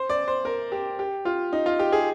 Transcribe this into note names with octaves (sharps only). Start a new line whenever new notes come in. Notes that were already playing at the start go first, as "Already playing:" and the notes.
Already playing: C5
D5
C5
A#4
G4
G4
F4
D#4
F4
G4
G#4